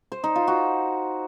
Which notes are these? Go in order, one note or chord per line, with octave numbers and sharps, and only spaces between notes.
C5
D#4
F4
F#4